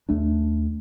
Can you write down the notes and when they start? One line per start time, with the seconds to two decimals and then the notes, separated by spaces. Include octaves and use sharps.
0.09 D#2 A3 D4